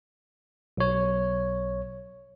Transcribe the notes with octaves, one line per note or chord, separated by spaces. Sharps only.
B1 C#5